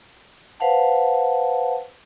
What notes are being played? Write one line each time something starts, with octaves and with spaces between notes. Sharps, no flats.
B4 C5 F5 F#5 A5